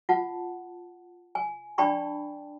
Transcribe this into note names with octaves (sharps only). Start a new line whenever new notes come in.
F4 F#5 A5
G#5
D4 D5 G5 A5 B5 C#6